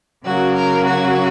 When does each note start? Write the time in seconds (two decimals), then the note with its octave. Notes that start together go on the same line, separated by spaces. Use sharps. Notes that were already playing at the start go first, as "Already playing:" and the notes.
0.24 C#3 F#3 A#3 F#4
0.54 A#4
0.85 F#4